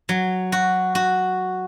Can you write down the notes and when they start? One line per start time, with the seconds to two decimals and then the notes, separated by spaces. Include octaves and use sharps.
0.09 F#3
0.52 F#4
0.95 F#4